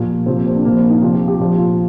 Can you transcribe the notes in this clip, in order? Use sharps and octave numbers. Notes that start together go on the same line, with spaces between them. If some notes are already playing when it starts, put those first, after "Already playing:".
Already playing: A#2 F3 G4
C3 F3 C4
A#3
C4
D4
A#2 F3 A#3
C4
D#4
C3 F3 F4
G4
G4
A#2 F3 F4
F4